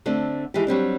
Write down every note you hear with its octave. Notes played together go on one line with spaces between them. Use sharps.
D3 A3 C4 D4
E3 F3 G#3 G4
F#3 G3 C4 D4